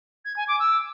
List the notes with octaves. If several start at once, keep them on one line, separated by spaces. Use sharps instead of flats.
G#6
G#5
D6
E6